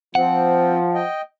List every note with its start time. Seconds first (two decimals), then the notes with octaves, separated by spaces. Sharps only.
0.15 F3 C4 F#5
0.94 D#5 G5